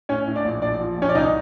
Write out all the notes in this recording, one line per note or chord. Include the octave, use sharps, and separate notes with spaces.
A2 C#4 C#5
A2
D4 D5
A#1
A#1 D4 D5
F3
A#1 C#4 C#5
D5
C2 D#4 D#5